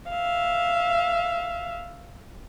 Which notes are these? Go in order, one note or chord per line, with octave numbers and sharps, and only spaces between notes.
E5 F5